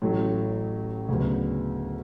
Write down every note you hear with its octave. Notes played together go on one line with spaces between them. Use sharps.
A1 A2 F#3 A3
D2 C#3 F#3 B3